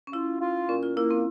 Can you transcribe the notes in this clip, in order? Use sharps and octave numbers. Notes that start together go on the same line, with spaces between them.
C#4
E4 F4
F4
A#2 C#4
F4
A#3 E4
C4